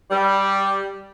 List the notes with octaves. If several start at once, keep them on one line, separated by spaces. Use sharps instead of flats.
G3